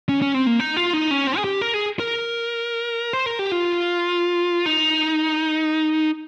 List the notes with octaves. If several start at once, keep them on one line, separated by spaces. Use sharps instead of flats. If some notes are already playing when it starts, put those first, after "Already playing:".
C#4
C#4
C4
A#3
D#4
F4
D#4
C#4
C4
G#4
G4
A#4
G#4
A#4
C5
A#4
G4
F4
D#4